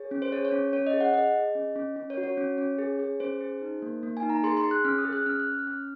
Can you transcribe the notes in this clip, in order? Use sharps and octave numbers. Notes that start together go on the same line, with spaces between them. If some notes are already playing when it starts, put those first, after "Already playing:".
Already playing: G#4 C#5
C#4
C5
G#4 C#5
C#5
C#4
C#4 C#5
D#5
G#4
F#5
G#4 D#5
G#4
C#4
C#4
C#4
C#5
F#4
C#5
C#4
C#4
G#4
G#4
C#4 C5
G#4
D#4
A#3
A#3
G#5
D#4
A#5
G#4 C6
C6
G#4
F#6
C#4 F6
D#6
G#4
F#6
C#4 F6
F#6
C#4
F6
C#4 F6